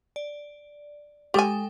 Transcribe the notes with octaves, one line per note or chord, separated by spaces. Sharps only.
D5
G#3 G4 A4 G5 G#5